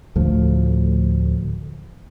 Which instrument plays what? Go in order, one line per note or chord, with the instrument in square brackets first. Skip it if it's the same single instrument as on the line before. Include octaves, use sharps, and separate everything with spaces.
[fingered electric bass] D2 A2 F3 A3